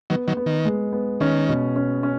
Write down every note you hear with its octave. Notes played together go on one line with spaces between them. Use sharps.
D#3 F#3 B3
D#3 F#3
B3
D#3
G#3
B3
D#3 C#4
B2
C#4
C#4